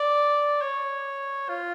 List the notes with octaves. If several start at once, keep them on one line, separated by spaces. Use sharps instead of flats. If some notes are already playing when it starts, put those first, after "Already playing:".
Already playing: D5
C#5
F4